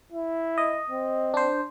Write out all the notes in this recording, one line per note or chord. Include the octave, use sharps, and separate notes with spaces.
E4
D#5
C4
D4 C5